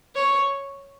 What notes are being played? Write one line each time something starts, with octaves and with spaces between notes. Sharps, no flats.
C#5